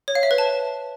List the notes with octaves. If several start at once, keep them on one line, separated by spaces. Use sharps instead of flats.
C#5
F5
E5
B4
A5